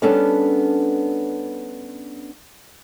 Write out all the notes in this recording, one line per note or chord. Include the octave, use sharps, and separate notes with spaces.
G3 B3 C#4 D4 A4